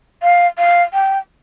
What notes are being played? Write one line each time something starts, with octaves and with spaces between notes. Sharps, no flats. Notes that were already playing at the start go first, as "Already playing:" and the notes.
F5
F5
G5